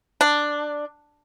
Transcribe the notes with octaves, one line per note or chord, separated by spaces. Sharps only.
D4